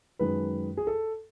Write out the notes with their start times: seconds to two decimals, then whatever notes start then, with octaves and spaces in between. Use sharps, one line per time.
0.19 F#2 D#3 G#3 B4
0.77 G#4
0.87 A4